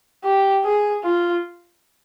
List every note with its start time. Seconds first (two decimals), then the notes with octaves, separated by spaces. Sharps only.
0.24 G4
0.64 G#4
1.04 F4